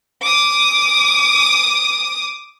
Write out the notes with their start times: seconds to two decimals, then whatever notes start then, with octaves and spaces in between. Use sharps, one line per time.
0.22 D6 D#6